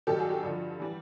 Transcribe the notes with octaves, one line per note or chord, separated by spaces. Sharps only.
G2 D#3 F#3 G4 A4
F#4 G#4
G4
G2 D3 F3
E3 G3